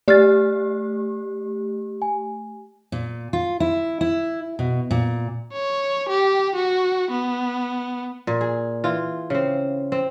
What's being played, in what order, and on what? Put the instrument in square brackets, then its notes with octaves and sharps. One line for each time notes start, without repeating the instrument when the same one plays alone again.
[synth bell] A3 G4 [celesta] D5 F6 A6
[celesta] G#5
[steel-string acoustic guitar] A#2
F4
E4
E4
B2
A#2
[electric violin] C#5
G4
F#4
B3
[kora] A#2
G#4
E3 F4
C#3 C4
C4